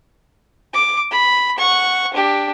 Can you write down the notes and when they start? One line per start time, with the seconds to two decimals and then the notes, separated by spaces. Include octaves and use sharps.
0.74 D6
1.11 B5
1.58 F#5 C#6
2.13 D4 G4